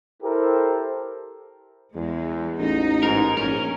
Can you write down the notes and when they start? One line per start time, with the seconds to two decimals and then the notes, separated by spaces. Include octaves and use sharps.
0.23 E4 G4 A4 A#4 C5
1.95 E2 G#3
2.60 A1 D#4
3.03 G#2 A#4
3.37 A#1 C#4 A#4